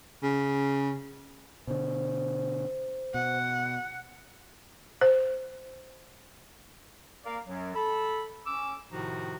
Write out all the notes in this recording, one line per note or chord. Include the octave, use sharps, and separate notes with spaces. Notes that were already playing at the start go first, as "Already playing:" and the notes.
C#3
B2 D3 C5
B2 F#5
C5
A#3 A#4 D5 F5
F#2 F#3
A4 B5
C#4 D6 E6
A2 C3 D#3 F3 D#4 F#4